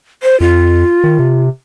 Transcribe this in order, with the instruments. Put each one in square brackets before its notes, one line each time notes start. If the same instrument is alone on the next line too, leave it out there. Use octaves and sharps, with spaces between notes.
[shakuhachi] C5
[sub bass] F2 [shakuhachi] F4
[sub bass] D#3
C3